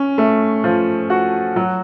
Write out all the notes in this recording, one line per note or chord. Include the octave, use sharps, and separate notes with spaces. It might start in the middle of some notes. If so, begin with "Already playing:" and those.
Already playing: C#4
A3
F3
F#4
F#3